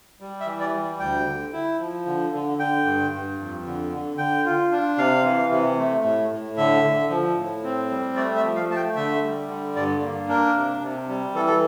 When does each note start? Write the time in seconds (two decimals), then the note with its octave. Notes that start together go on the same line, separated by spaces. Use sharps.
0.20 G3
0.40 E5
0.46 E3
0.60 D5
0.73 G3
0.99 D2 G5
1.26 D3
1.53 E4
1.79 F3
2.06 D3
2.33 D3
2.58 D3 G5
2.86 G2
3.12 G2
3.38 F2
3.65 D3
3.92 D3
4.18 D3 G5
4.45 F4
4.71 D4
4.97 C3 F5
5.24 E3
5.51 C3
5.78 A3
6.04 A2
6.31 A2
6.57 D3 E5
6.84 D3
7.10 F3
7.36 A2
7.64 C4
7.90 G3
8.16 A3 D5
8.36 E5
8.43 F3
8.56 F5
8.69 A3 A5
8.76 G5
8.96 D3 E5
9.23 G3
9.49 D3
9.76 G2 D5
10.02 A#3
10.29 D4 A#4
10.56 C3
10.82 C3
11.09 G3
11.35 E3 A4
11.47 A4